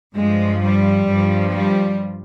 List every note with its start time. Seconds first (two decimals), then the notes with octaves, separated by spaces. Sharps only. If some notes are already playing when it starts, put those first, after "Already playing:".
0.15 G2 F3 G#3
0.61 G3
1.07 G2 F3
1.53 G3